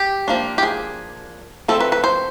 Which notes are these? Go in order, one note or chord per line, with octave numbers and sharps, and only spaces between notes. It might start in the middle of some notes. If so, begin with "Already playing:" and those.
Already playing: G4
F3 A#3 D4
G4
G#4
F3 A3 C4 A4
B4
B4
C5